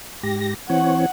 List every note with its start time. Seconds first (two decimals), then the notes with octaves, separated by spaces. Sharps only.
0.23 G#2 G4 A#6
0.70 E3 C4 C#5 F#5